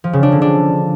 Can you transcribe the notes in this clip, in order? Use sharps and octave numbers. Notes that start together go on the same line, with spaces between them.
F3
C#3
D4
D3
D4